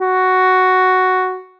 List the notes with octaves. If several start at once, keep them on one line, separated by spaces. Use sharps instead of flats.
F#4